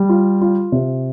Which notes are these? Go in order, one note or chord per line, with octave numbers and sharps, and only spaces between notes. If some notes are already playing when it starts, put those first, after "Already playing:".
Already playing: G3
F4
F4
C3